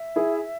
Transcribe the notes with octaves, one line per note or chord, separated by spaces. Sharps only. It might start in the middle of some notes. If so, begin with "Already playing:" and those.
Already playing: E5
E4 G#4